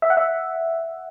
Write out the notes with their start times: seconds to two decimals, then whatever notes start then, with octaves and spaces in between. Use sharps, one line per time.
0.02 E5
0.10 F#5
0.17 E5